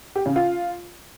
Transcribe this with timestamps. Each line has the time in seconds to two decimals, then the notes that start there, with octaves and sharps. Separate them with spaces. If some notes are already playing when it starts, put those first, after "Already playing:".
0.16 G4
0.26 C#3
0.36 F4